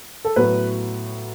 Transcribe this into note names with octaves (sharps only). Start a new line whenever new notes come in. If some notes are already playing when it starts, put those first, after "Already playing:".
A4
A2 F#3 B3 B4